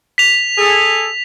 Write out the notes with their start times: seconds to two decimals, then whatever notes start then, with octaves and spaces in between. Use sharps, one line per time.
0.18 B6 F7
0.57 G#4 A4